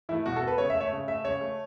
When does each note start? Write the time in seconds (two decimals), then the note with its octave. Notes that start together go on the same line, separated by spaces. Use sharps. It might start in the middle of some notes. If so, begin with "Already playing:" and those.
0.09 E3 A3 E4
0.26 B2 F#4
0.36 A4
0.42 B3
0.48 B4
0.58 C#3 C#5
0.70 E5
0.75 A3
0.81 C#5
0.92 C#3
1.08 A3 E5
1.25 C#3 C#5
1.41 A3